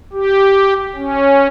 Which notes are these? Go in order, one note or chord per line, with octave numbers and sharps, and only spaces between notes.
G4
C#4